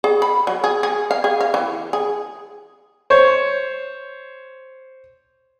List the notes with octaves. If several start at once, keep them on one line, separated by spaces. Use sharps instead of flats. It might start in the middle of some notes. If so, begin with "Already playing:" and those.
G#4
B5
F#3
G#4
G#4
F5
G#4
F5
E3
G#4
C5 C#5